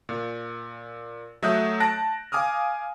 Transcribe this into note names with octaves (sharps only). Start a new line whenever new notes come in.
A#2
F#3 A3 E5 D#6 F#6 G6
A5 F#6 A#6 D7
F5 G#5 D6 D#6 F6